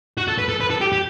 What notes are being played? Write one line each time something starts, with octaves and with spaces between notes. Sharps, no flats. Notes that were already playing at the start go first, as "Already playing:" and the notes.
F#4
A4
B4
A4
B4
A4
G4
G4